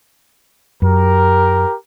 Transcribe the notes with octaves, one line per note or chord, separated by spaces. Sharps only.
F#2 G4 A#4